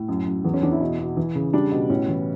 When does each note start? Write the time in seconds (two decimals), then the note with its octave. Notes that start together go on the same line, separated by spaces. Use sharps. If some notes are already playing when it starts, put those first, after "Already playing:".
Already playing: A2
0.08 F#2
0.27 F#2
0.44 E2
0.54 C#4
0.63 E2 D4
0.72 E4
0.81 B2
0.99 B2
1.17 E3
1.35 C#3
1.53 G3 D4
1.71 B2
1.89 A2 C#4
2.08 E3